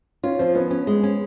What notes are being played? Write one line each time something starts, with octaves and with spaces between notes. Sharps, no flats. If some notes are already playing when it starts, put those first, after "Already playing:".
C#4 F4
F3 C4
B3 C#4
C#4
G#3
C#4